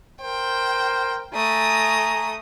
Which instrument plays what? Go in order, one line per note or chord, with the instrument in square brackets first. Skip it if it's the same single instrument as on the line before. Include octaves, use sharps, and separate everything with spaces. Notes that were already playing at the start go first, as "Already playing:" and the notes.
[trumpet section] A#4 C5 [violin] G5
[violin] A3 D#6 [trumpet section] G#5 A#5